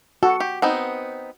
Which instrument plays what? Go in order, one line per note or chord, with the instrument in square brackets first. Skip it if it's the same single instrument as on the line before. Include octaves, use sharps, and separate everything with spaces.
[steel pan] F#4 [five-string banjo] A4
[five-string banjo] G4
B3 C4 D#4